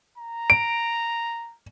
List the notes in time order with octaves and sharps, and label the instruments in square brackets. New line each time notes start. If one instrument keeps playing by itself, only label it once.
[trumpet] A#5
[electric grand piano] D7